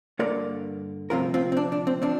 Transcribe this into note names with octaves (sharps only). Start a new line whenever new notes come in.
G2 D3 A#3 A#4 D5
D2 C3 F3 C4 F4 A#4
C4 F4
C4
D4
D4
C4
F3 C4 D4